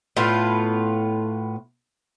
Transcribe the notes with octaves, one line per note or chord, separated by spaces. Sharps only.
A2 B3 F4